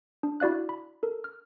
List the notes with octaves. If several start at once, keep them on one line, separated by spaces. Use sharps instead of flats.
D4
E4 F#4 D5 F5 F#6
B5
A4 A#4
F6